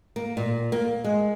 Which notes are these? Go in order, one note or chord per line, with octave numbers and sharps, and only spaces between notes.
A#3
A#2
A#3
G#3